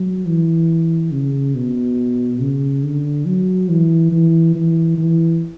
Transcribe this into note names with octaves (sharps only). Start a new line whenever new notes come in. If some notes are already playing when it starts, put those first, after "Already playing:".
Already playing: F#3
E3
C#3
B2
C#3
D3
F#3
E3
E3
E3
E3